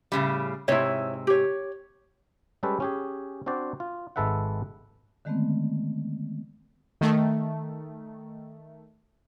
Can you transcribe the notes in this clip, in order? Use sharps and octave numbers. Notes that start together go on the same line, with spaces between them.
A2 C#3 G3
G#2 C3 E4 C#5
G4 C#5
G3 G#3 C#4 G4 A4 B4
C#4 G4 G#4
C4 D4 F#4 C5 D5
F4
G#1 G#3 A4 B4 E5 F#5
D3 D#3 G#3 A3 B3 C4
D#3 A3